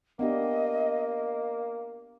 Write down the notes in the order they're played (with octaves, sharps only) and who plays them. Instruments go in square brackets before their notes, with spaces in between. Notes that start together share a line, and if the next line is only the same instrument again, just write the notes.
[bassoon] A#3 [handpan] B3 D4 G4 [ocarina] D#5